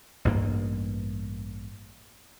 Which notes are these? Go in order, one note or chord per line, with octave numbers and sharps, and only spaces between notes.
A1 G2 A#3